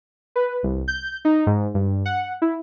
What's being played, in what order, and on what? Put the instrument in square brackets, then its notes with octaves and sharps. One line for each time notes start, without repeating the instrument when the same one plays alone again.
[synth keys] B4
C2
G6
D#4
G#2
G2
F#5
E4